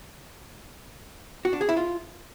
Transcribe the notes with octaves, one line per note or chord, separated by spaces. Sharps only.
F#4
D4
G#4
E4
F4